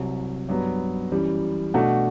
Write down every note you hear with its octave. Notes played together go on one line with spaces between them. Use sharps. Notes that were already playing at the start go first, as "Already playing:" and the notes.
Already playing: C2 C3 F#3
G2 F#3 B3
F#2 E3 G3
B2 A3 D4 F#4